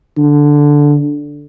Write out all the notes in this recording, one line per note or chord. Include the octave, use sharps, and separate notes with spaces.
D3